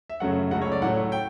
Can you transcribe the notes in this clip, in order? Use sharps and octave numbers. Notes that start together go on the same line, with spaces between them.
E5
F#2 C#3 F#3 A3 F#5
C#2 C#3 F#3 A3 F#5
C#5
D5
A2 F#3 A3 F#5
G5